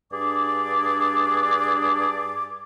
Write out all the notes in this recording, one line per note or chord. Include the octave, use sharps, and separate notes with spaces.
G2 D4 G#4 D5 D6